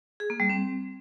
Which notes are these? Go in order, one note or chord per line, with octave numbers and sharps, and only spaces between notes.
G#4
A#3
G3
C4